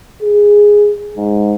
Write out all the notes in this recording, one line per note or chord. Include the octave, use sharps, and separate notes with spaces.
G#4
G#2